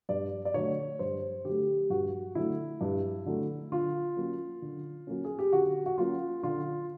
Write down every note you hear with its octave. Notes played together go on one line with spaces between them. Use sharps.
G2 D5
D5
D3 F#3 A3 C#5
G2 C5
D3 F#3 A3 G4
G2 F#4
D3 F#3 A3 E4
G2
D3 F#3 A3
D3 F4
F#3 A#3 C#4
D3
F#3 A#3 C#4
G#4
G4
D3 F#4
F#4
F#3 A#3 C#4 F4
D3 F4